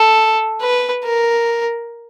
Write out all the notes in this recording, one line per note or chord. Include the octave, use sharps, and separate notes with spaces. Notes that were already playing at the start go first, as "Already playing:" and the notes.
Already playing: A4
B4
A#4